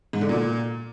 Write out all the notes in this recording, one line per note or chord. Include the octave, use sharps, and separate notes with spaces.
G#2
D3
A#2